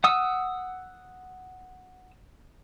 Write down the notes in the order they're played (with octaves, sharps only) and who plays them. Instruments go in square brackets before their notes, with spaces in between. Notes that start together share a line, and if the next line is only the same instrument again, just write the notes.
[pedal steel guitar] F#5 D#6 E6